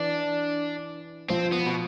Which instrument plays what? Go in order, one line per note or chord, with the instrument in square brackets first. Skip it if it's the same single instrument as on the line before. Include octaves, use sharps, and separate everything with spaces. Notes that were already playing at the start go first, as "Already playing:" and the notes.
Already playing: [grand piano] E3 [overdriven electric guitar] D4
[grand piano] F3 [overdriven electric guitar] C4
[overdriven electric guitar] B3
B2